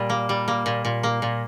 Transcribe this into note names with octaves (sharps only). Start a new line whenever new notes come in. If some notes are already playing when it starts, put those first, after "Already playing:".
Already playing: A#2 G3
A#3
G3
A#3
A#2
A#2
A#3
A#2